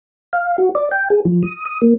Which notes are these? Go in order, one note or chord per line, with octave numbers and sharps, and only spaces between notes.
F5
F#4
D5
G5
G#4
F3
D#6
D#6
A#3